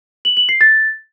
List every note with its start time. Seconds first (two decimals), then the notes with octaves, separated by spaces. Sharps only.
0.25 F#7
0.37 F#7
0.49 C7
0.61 A6